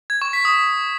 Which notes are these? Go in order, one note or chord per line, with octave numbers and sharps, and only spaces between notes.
G#6
C#6
B6
D#6